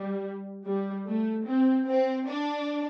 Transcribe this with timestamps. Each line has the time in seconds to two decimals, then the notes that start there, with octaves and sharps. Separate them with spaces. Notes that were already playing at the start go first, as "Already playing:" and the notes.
Already playing: G3
0.65 G3
1.06 A3
1.46 C4
1.87 C4
2.27 D4